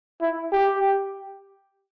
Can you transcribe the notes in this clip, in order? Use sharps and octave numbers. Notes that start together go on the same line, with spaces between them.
E4
G4